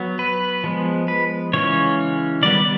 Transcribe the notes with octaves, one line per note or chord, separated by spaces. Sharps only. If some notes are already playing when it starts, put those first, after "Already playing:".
Already playing: F#3 B3
B4
F3 G#3 B3
B4
C#3 E3 G#3 C#4 C#5
D#3 G3 B3 D5